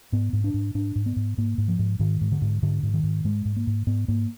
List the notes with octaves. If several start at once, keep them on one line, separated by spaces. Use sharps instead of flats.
G#2 B3
G#2
D4
G#2
G#2 D4
G#2
B3
G#2
G#2 A#3
G#2
F3
G#2
G#2 D#3
G#2
D3
G#2
G#2 D3
G#2
D#3
G#2
G#2 G#3
G#2
A#3
G#2
G#2 B3
G#2 A#3